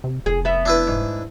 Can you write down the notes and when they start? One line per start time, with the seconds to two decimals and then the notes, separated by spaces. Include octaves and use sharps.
0.04 C3
0.26 F1 G#4
0.45 B3 E5
0.65 D4 E4 B4
0.87 G#2